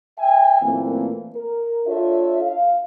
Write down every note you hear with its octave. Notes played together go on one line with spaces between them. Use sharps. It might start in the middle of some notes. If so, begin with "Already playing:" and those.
E5 G5 G#5
F#2 A#2 E3 A3 A#3 C4
A#4
D4 F4 A4 C#5 E5
F5